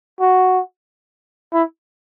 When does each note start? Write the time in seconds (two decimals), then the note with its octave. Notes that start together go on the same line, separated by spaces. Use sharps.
0.21 F#4
1.53 E4